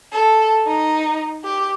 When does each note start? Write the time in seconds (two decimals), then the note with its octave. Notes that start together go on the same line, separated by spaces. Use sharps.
0.12 A4
0.66 D#4
1.44 G4